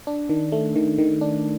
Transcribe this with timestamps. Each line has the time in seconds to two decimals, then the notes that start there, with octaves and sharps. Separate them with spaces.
0.07 D4
0.29 D#3
0.52 A3
0.76 D#3
0.98 D#3
1.21 D4